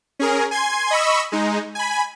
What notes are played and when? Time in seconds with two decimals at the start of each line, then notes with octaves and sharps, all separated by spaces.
0.19 C#4 G#4 A#4
0.51 G#5 C6 G#6
0.91 D#5 B5 C#6 E6
1.32 G#3 D#4
1.75 G#5 B5